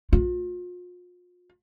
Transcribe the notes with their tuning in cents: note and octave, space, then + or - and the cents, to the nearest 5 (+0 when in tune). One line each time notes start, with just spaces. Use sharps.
F4 +40